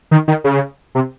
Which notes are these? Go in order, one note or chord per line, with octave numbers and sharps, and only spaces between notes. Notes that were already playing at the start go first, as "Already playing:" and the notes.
D#3
D#3
C#3
C3